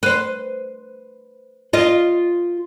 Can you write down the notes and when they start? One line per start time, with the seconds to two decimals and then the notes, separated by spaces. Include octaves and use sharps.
0.03 B4 C5
1.73 F4 D#5